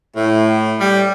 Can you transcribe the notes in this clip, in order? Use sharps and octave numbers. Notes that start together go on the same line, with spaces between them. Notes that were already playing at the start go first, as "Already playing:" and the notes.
A2
G3